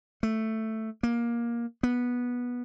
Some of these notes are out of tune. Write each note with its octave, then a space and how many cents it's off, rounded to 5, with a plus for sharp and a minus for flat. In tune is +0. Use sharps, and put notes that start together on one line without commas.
A3 +5
A#3 +15
B3 -15